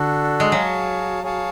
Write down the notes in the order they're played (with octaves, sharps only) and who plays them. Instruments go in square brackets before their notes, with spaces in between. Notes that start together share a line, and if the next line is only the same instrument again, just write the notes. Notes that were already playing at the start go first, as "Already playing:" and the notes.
Already playing: [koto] D3 [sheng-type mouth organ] D4 F#4 A4
[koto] G#3
[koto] F#3 [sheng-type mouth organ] G#4 C#5 F5 A5
[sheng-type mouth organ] G#4 C#5 F5 A5